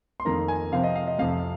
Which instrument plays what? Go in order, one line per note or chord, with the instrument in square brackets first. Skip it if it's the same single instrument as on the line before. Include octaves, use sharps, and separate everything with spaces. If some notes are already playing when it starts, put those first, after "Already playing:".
[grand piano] C6
F2 D#3 A#3 A#5
G#5
C3 F3 C4 F5
D#5
F5
D#5
F2 C3 F3 F5